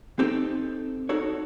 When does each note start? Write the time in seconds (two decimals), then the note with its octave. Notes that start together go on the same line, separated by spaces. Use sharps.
0.19 C4 D#4 G4 A4
1.09 D#4 F#4 A4 C#5